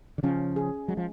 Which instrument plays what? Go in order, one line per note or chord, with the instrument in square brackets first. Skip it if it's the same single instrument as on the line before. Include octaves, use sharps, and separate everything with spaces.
[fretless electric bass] D3
[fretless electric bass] C#3 F3 [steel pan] C#4
[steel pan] G#4
[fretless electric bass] F#3 [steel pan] G#3
[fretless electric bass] F3